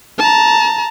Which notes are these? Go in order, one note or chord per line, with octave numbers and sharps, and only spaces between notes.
A5 A#5